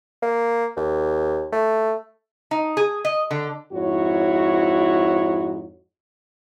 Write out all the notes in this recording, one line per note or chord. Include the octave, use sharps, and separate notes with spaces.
A#3
D#2
A3
D#4
G#4
D#5
D3
F2 G#2 E4 F#4 C#5